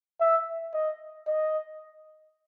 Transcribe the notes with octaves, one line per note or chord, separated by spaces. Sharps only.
E5
D#5
D#5